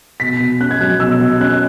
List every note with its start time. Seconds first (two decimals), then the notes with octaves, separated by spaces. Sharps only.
0.20 B2 B6
0.40 B2
0.60 C#4 F#6
0.71 G#6
0.81 F#3 F#6
1.00 B2 E6
1.20 B2
1.40 C#4 F#6